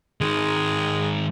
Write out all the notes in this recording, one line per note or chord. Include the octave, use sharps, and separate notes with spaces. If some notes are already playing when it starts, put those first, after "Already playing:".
G#2 D#3 G#3